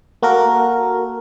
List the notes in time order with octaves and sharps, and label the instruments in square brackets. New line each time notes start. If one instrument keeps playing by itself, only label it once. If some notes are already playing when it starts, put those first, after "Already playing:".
[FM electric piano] A#3 F#4 A4 A#4